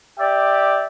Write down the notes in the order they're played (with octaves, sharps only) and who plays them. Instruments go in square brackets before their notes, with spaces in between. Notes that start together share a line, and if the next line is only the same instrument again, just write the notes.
[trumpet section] G4 D5 E5